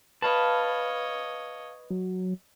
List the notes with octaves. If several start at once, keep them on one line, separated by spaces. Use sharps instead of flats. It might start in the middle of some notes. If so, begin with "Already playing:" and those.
B4 C#5 D#5 F5 A5
F#3